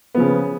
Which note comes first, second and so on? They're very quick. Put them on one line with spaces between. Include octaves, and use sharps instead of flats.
B3 F3 C#3